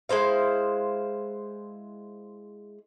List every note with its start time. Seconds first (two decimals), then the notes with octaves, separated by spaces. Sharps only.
0.09 G#3 E4 C5 F5